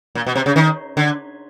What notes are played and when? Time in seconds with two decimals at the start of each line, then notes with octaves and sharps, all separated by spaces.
0.15 A#2
0.27 B2
0.36 C3
0.46 C#3
0.56 D#3
0.97 D3